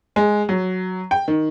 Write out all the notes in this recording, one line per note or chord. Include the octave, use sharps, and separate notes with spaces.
G#3
F#3
G5
D#3